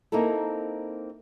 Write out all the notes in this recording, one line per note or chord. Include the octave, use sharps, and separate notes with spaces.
A#3 C4 D#4 E4 A4